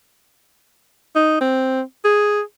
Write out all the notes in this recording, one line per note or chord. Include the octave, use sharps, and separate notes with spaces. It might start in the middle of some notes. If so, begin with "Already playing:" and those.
D#4
C4
G#4